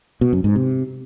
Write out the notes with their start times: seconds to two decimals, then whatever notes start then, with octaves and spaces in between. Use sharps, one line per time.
0.21 B2
0.33 F#2
0.44 G#2
0.56 C3